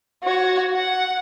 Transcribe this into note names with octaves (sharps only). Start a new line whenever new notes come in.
F#4 C#5
F#5